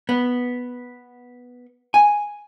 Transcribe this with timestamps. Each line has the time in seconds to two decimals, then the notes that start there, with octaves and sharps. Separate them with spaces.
0.09 B3
1.94 G#5